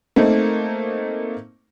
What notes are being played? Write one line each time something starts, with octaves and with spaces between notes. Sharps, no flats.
A3 A#3 C4 D#4